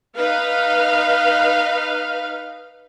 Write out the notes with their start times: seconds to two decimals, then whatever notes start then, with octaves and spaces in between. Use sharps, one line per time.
0.16 D#4 B4 F5